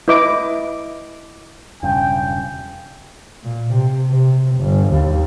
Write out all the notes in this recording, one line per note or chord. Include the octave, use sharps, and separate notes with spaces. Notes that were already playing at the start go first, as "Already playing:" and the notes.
E4 B4 D#5 D6
E1 G2 C#3 G5
A#2
C3
C3
G1
D#2